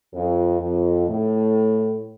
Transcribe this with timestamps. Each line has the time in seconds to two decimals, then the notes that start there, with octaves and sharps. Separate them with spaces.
0.13 F2
0.60 F2
1.07 A2